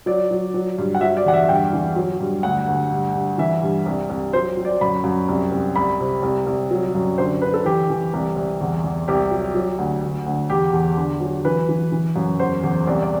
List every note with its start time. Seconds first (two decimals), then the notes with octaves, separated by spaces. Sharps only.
0.06 F#3 D5
0.31 F#3
0.54 F#3
0.78 G2
0.95 F#5
1.01 F#3 E5
1.17 D5
1.25 E2 F#5
1.33 E5
1.49 G2 G5
1.73 E3
1.96 F#3
2.20 G2
2.43 D2 F#5
2.67 D2
2.91 G2
3.14 G2
3.38 E3 E5
3.63 G2
3.86 C2
4.09 C2
4.33 F#3 C5
4.57 F#3
4.65 D5
4.81 F#2 B5
5.04 F#2
5.28 C2
5.52 C2
5.76 C2 B5
6.00 C3
6.22 C2
6.46 C2
6.71 F#3
6.95 F#2
7.18 D3 C5
7.42 D3 B4
7.54 A4
7.65 E3 G4
7.90 E3
8.13 C2
8.36 C2
8.61 E2
8.84 E2
9.08 C2 G4
9.31 F#3
9.54 F#3
9.78 D2
10.03 D2
10.26 D2
10.50 E2 G4
10.73 E2
10.97 D3
11.20 F#3
11.45 E3 B4
11.69 E3
11.92 E3
12.16 F#2
12.39 E2 C5
12.63 E2
12.87 C2 D5
13.03 D5